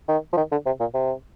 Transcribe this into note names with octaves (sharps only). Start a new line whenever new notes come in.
D#3
F3
D#3
D3
C3
A#2
C3